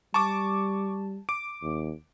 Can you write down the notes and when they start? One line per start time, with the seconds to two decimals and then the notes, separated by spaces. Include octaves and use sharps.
0.14 G3 A5 C#6 D6
1.29 D6 D7
1.63 D#2